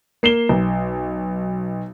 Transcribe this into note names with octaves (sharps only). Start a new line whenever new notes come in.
A#3 C7 E7 G7
B1